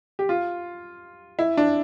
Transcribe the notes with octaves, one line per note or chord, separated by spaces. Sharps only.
G4
F4
E4
D4